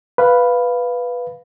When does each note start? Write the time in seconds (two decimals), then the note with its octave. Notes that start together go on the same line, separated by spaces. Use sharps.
0.18 B4 F5